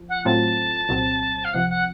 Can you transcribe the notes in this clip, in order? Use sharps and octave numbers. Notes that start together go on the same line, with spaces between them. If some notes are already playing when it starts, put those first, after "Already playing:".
Already playing: F3
F#5
A2 F#3 A3 C4 F4 A5
C2 A#2 F#3 C4
F5
C#2 C3 F3 F#5
F#5